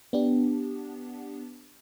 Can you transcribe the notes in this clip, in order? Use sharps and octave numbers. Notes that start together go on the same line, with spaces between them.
B3 D4 G4